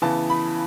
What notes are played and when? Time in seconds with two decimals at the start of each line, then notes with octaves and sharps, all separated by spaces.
0.02 C#3 E3 B3 A5
0.30 B5